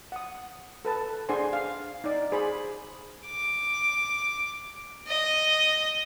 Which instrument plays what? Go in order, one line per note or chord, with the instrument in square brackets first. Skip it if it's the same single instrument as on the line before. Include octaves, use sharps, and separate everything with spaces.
[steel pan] F#5 D#6
A4 B4 A5
D4 G#4 C5 F#5 G#5 C6
F5
D#4 D5
G#4 C5 B5
[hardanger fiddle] D6
D#5